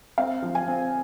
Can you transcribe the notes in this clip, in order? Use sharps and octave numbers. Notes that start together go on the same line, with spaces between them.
C4 F5
F3
G#5
C4